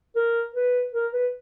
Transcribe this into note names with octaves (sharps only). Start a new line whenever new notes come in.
A#4
B4
A#4
B4